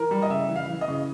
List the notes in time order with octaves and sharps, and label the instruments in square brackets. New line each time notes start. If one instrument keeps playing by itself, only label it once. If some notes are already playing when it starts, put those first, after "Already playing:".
Already playing: [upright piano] E3 A#4
G3
D#5
C#3 E5
E3
F5
E3
D#5
C#3